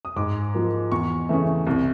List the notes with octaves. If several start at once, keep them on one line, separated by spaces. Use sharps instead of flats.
D#6
G#2 D6
F3 A#3
E2 C#6
C#3 E3 A3
C2